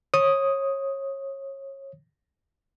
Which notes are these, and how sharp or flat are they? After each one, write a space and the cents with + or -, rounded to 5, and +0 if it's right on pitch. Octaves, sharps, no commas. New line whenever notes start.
C#5 -25 D#6 +0